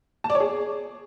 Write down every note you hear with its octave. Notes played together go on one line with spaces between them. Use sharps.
A5
D5
C#5
G#4